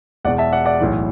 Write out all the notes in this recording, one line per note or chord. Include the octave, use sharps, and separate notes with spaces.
E1 E2 B2 D5 F#5
E5 A5
D5 F#5
D5 F#5
B1 A2 E3